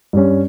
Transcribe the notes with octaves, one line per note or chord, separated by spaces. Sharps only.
G2 G3 C#4